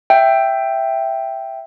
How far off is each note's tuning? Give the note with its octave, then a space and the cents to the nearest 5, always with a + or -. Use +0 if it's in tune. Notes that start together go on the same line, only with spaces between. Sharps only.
E5 +5 G5 +0